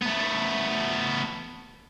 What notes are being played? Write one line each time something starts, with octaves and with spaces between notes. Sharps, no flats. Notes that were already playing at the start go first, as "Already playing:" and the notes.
A3 B3